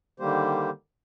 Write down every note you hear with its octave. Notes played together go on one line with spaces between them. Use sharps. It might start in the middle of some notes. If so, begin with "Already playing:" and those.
D3 D#3 G3 A#3 G4 C5